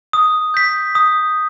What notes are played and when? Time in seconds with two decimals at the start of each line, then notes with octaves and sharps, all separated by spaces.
0.13 D#6
0.54 G6 B6
0.95 D#6